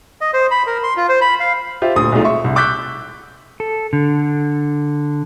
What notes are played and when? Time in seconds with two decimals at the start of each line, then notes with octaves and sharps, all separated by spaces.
0.21 D#5
0.34 C5
0.51 B5
0.67 A#4
0.83 C6
0.97 F4
1.09 C5
1.21 B5
1.40 F5
1.82 F4 G4 C5 E5
1.95 D#1 D2 D#6
2.12 B1 G#3 A3 D#4 F4
2.24 E5 C#6
2.44 C2
2.56 C#6 D6 E6 F#6 G6 B6
3.60 A4
3.93 D3